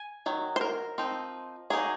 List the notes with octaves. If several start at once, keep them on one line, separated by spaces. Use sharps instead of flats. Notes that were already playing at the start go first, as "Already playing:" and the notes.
Already playing: G#5
D#3 F#3
C5
A#4
F3 C4 D#4
F#3 A#3 D#4 G#4